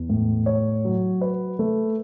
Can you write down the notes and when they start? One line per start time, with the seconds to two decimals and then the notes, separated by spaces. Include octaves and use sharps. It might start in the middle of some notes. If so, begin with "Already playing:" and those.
Already playing: E2
0.09 A2
0.46 C#5
0.85 F#3
1.21 B4
1.59 A3